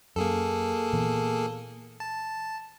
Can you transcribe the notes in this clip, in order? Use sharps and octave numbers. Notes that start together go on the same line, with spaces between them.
F#2 A#3 G#4 A4
A#2 E3 B3
A5